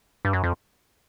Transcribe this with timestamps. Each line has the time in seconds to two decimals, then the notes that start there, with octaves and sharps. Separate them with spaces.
0.25 G2
0.33 F#2
0.44 F2